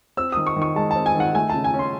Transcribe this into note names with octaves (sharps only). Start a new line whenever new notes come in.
C4 E6
D#3 D#6
C#6
D#3
C#6
G#3 A5
C4 A5
G#5
D#3 F#5
A3 G#5
C#3 A5
G#5
C#4
C6